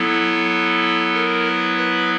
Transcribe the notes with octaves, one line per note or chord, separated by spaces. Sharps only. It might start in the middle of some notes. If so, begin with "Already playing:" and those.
Already playing: F#3 B3 E4 A4
A#4
B4
B4